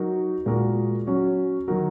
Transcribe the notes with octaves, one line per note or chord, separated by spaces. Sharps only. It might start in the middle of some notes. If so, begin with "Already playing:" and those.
Already playing: F#3 D#4 F#4 A#4
A#2 G#3 F#4 A#4
F#3 C#4 F#4
D#3 F#3 D#4 F#4 A#4